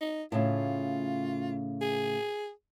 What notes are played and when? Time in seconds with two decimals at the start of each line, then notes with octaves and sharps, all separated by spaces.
0.01 D#4
0.32 A2 C#3 F4
1.81 G#4